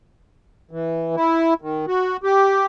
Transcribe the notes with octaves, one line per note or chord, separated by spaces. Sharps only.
E3
E4
D#3
F#4
G4